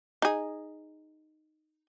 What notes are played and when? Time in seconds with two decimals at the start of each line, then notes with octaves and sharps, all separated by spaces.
0.22 D#4 G#4